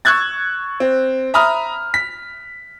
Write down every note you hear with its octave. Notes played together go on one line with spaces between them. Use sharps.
C#6 E6 F#6 G#6 A6
C4
E5 A#5 B5 D#6 F6
B6